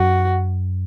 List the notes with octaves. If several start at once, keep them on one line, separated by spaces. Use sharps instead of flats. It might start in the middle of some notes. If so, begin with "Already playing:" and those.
Already playing: F#2 F#4